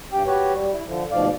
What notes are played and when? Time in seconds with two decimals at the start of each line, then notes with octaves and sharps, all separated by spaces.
0.13 G2 G4 G5
0.27 F#4 G4 B4 C#5
0.54 G3
0.73 E4
0.87 D3 F3
1.11 D2 G#2 B2 F3 D5 F5